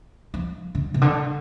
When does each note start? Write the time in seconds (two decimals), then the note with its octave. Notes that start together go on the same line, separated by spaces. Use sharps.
0.34 F3
0.75 D3
0.94 C3
1.02 D3